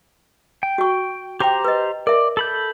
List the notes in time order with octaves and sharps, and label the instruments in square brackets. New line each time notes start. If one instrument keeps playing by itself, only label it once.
[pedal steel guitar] G5
[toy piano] F#4 C#6
[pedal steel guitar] G4 C5 A#5 [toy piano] G5 D6
[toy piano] B4 D#5
[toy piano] A#4 E5 [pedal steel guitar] D5
[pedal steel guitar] A4 B5 G6